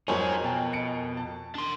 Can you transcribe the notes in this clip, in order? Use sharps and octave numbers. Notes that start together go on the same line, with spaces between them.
F2 F#3 D#4 G#4 A#4 C5 C#5 G#5
B2 G5 A5
D#5 C#7 D7
A5
D4 C6